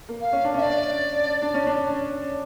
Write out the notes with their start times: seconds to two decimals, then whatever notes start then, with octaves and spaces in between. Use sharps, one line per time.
0.09 A#3
0.21 F5
0.33 C#4
0.44 D4
0.54 C#4 E5
0.62 D5
1.42 D4
1.54 C#4
1.67 D4